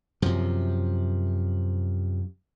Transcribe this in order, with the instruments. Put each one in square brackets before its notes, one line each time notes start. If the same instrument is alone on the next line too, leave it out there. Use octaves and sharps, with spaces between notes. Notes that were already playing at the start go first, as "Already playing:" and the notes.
[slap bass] F#2 C3 F3